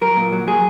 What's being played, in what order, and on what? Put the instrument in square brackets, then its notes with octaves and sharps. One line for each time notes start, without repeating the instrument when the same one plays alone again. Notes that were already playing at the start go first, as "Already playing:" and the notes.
[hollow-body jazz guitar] F#3 A#4
A#2
F#3
F#3 G#4